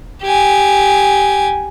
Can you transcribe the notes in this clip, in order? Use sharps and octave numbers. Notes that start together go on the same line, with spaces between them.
G4 G#5